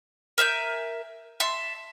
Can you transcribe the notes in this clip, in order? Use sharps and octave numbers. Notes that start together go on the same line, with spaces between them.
A#4 E5 G#5 G6
E5 A5 C6